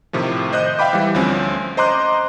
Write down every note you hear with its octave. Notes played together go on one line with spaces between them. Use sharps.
A2 C3 D#3 F3
C5 D#5 F#6 G6
E5 F5 G5 B5 D6
E3 G3
D2 F3 C4 C#4
C5 D#5 A#5 C6 D6 F#6